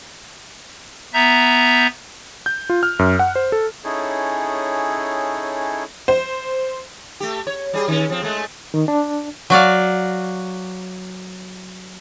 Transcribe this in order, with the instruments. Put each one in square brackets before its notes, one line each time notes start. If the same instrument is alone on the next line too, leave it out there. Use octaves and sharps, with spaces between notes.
[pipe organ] B3 E5 A#5 G6
[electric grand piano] G6
F4
F6
F#2
F#5
C5
A4
[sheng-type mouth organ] C#4 D#4 E4 G#4 A4 C#5
[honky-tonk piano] C5
[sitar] A3 G4
C#5
G3 G#4
D#3 C#4
F3 C4
G#3 A3
[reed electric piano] D#3
D4
[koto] F#3 F#4 D5 F5